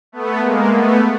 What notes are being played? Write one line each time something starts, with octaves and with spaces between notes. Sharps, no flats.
A3 B3
G#3 A#3
A3 B3